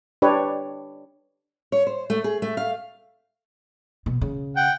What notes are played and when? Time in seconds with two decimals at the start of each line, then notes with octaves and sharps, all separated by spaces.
0.22 D4 G4 B4 C#5
1.72 C#5
1.87 C5
2.10 A3
2.24 G#4
2.42 A3
2.57 F5
4.06 B2
4.21 C#3
4.57 F#5 G5